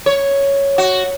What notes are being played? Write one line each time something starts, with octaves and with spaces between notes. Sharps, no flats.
C#5
F#4